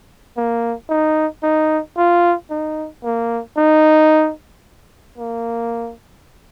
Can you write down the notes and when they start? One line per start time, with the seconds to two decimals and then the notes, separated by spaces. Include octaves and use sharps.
0.37 A#3
0.89 D#4
1.43 D#4
1.97 F4
2.50 D#4
3.04 A#3
3.57 D#4
5.18 A#3